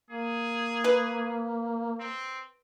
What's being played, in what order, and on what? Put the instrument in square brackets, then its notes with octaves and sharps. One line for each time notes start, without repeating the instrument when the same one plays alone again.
[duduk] A#3 [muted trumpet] G#4
[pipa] B4
[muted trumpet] C4